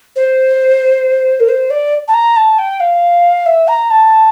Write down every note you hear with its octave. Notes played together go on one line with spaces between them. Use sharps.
C5
A#4
C5
D5
A5
A#5
A5
G5
F5
E5
A#5
A5